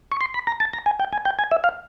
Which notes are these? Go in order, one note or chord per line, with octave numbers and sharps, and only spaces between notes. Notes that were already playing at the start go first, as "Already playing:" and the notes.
C#6
C6
B5
A#5
A5
A#5
G#5
G5
G#5
G5
G#5
E5
F5